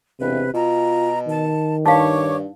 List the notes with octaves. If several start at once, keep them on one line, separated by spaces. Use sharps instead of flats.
E1 C3 B4
B2 F4 A#5
D#3 A5
G2 D#4 C#5 F5 C#6 D6